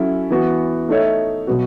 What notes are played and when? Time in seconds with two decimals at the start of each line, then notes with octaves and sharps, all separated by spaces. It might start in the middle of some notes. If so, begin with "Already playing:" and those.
Already playing: F#3 C#4 E4 A4
0.30 E3 B3 F#4
0.89 A3 D#4 A4 C#5 E5
1.47 B2 F#3 B3 F#4